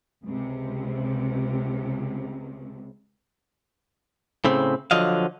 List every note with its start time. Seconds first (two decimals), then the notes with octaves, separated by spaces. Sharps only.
0.24 C#2 C3
4.45 A2 C#3 C4
4.91 D3 F3 F#3 D#5 F5